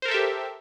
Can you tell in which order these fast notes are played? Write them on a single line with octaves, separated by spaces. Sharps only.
C5 A#4 A4 E5 G4